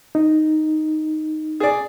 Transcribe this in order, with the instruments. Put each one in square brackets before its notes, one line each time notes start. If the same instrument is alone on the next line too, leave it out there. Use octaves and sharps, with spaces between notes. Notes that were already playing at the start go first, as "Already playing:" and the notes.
[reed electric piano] D#4
[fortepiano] G#4 D5